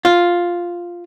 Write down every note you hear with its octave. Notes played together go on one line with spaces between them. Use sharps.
F4